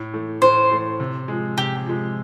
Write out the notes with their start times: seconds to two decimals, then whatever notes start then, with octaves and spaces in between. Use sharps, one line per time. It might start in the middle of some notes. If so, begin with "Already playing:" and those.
Already playing: A2
0.13 E3 A3
0.42 A2 C5
0.71 E3 A3
1.00 C3
1.28 F3 G#3
1.58 C3 G4
1.86 F3 G#3